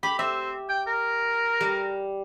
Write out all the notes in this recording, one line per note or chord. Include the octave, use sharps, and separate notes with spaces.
G4 B5
C4 E5
G5
A#4
G3